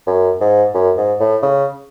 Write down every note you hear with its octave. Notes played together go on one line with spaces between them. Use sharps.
F#2
G#2
F#2
G#2
A2
C#3